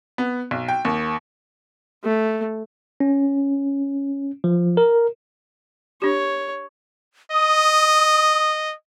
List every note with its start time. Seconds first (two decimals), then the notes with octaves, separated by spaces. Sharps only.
0.18 B3
0.51 B1
0.68 G5
0.85 D#2
2.04 A3
3.00 C#4
4.44 F3
4.77 A#4
6.02 D4 G4 C#5
7.32 D#5 D#6